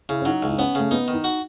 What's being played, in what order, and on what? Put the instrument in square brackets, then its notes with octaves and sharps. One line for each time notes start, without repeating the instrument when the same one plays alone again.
[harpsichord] C#3 [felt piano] E4
[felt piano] C#4
[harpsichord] F#3 [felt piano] D#4
[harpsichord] C#2
[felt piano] D#4
[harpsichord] B3 [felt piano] C#4
[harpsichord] C#3 [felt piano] A3
[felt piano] B3 [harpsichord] D#4
[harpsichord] D#3
[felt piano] D#4
[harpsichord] F#4